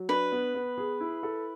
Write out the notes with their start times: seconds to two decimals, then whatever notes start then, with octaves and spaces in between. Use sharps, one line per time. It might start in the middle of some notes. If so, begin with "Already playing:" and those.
Already playing: F#3
0.09 D4 B4
0.32 B3
0.55 B3
0.78 G#4
1.00 E4
1.23 A4